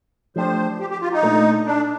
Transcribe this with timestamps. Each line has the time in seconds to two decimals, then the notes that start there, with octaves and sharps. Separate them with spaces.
0.36 F3 A3 D4 G4 C5
0.80 G4
0.90 G4
1.01 F4
1.13 D#4
1.23 A#2 A3 D4
1.66 D4